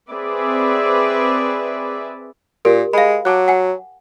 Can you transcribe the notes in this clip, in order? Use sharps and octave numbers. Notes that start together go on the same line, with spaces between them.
C4 G#4 B4 D5 E5
A#2 G4 A#4
G#3 F5 B5
F#3 A5 D6 F#6
F#5 G#5